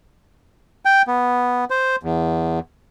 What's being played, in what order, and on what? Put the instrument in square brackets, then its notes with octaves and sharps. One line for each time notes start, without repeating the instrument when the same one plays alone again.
[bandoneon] G5
B3
C5
E2